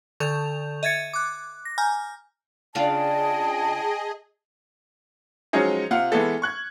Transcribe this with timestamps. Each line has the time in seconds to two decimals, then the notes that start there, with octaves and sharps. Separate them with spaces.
0.20 D3 A4 C#6 G6 F7
0.83 D#5 E5 G#6 A6 C#7
1.13 D6 F#6
1.65 A#6
1.78 G#5 A#5 F6 G6
2.75 C#3 D4 F4 G#4 D#5 G5 A5
5.53 F3 F#3 G#3 C#4 D#4
5.91 C3 F4 F#5 F6
6.12 E3 G#3 B3 A4
6.42 C#6 F#6 G#6